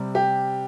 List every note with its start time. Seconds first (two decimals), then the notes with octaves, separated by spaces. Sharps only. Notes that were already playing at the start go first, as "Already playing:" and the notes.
Already playing: C3 G3 C4
0.15 G4